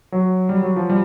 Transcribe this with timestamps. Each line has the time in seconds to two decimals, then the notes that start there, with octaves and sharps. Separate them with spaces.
0.12 F#3
0.49 G3
0.63 F#3
0.76 F3
0.90 G3